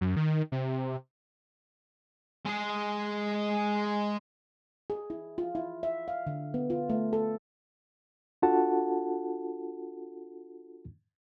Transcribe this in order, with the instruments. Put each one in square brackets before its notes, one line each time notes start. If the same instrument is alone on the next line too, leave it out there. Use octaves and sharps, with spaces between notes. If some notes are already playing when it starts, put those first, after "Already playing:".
[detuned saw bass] F#2
D#3
C3
[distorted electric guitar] G#3 G#4
[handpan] G#4
E4
F4
E4
E5
F5
D3
B3
F4
A3
A4
[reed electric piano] D4 F4 F#4 A4 F#5 A5